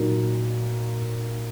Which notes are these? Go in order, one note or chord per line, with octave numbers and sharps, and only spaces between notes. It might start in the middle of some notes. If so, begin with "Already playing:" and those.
Already playing: A#2 F#3 A#3 D#4